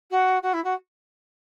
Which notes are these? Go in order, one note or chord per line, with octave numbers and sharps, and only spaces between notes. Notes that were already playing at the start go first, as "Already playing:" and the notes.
F#4
F#4
E4
F#4